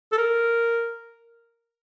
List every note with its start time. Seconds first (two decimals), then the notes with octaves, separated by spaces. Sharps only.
0.12 A4
0.18 A#4